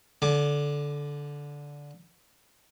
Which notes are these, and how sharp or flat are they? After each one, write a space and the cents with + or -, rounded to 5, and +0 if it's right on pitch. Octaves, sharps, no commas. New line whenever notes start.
D3 -15 G#5 +35 D6 +10